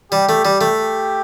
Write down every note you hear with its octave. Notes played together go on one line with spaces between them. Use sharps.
G3 G4
A3
G3
A3
G4